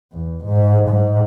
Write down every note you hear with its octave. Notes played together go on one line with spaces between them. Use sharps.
E2
G#2
G#2